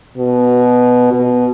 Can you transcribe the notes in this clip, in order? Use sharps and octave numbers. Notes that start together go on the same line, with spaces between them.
B2
B2